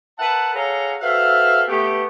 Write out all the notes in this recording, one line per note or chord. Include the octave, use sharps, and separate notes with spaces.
A#4 B4 E5 F#5 A5
G#4 A4 C#5 F5 F#5 A#5
F#4 A4 B4 C5 E5 F5
A3 B3 G4